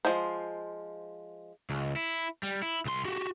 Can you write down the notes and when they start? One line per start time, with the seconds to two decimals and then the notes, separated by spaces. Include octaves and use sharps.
0.05 F3 G#3 C5
1.70 C#2
1.96 E4
2.43 G3
2.62 E4
2.85 C2 C6
3.05 F#4 G4